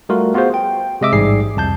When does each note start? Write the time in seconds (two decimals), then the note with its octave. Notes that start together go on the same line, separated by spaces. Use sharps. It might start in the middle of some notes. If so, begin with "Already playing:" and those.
0.09 G3 A3 F4 F#4 A#4
0.34 B3 F4 F#4 G#4 C5
0.54 G5
1.01 C3 G#3 D#5 E5 D6 E6
1.13 A1 G#2 G3 G#4 C7
1.56 C2 F2 A5 G6